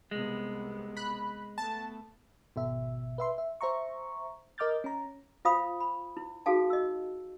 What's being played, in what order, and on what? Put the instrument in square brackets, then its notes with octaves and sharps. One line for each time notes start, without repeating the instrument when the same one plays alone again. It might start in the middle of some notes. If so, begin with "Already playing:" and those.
[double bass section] C2 C3 B3 [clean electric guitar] G#3
[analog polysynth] B5 F#6
[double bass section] A3 B3 [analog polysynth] A5
[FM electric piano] G#1 B2 E5
B4 E5 C6
E5
C5 E5 A#5 C#6
A#4 D#5 D6 F6 G6 A6
C#4 A#5
[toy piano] F4 C5 F5 B5 D#6
B5
E4
D#4 F#4 G#4 A4 F5 A5
D#5 E6